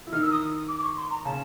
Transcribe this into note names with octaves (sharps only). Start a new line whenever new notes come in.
E4
D#3 D#4 F6
E6
D#6
D6
D6
C#6
C6
A#5
C#3 C#4 A5